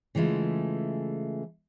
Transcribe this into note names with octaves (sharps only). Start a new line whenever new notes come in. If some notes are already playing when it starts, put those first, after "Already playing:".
C#3 E3 G#3 A3 F4